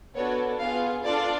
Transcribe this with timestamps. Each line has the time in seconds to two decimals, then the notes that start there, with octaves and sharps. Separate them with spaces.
0.15 B3 D4 F#4 A4 C#5
0.59 B3 F4 G#4 F5
1.03 D4 F4 A4 D5